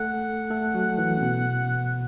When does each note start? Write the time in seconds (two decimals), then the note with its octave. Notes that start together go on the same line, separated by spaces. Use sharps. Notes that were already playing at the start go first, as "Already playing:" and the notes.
Already playing: A3 A4 F#5
0.51 A3 A4
0.74 F#3 F#4
0.98 E3 E4
1.17 C#4
1.21 B2 B3